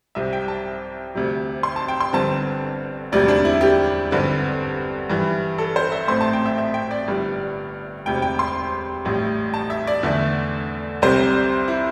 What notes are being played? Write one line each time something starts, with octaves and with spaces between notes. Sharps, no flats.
C2 C3 G3 C4 E5
G5
A5
D2 C3 G3
C6
A5
G5
C6
G1 G2 D3 C4 A5
E1 D2 C3 G3 D5
D4
E4
G4
G1 G2 D3 C4
G2 E3 G3
A4
C5
E5
A1 A2 A3 C4 C6
A5
G5
E5
E5
G5
D5
G1 G2 G3
E1 D2 C3 G5
G5
C6
A1 A2 G3
A5
E5
D5
E2 D3 A3
C2 C3 G3 C4 C5
E4